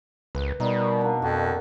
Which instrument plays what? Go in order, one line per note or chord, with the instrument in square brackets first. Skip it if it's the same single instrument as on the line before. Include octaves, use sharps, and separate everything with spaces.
[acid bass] C#2 [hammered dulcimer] B4
[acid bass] B2 [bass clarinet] G3 [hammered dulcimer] D#4 A#4
[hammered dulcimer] A#3 D4
[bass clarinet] F2 [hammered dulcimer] F#4